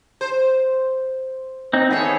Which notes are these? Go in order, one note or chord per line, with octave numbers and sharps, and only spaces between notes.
C5
C4 D#4
D#3 E3 B3 G#4 A4 C#5